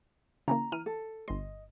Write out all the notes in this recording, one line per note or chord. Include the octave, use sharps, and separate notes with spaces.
C#3 E3 A#3 A#5
E3 F6 D#7
A4
G1 D#5 C6